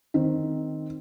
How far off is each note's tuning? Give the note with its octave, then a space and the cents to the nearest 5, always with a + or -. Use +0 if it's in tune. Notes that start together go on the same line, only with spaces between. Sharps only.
D#3 +0 C4 +0